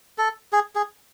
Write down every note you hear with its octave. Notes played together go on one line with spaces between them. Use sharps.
A4
G#4
G#4